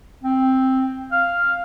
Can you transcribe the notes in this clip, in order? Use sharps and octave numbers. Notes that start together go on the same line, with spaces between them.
C4
F5